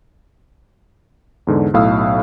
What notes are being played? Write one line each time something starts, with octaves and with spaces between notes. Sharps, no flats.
E2 G#2 D3
B1 A2 F5 D#6 E6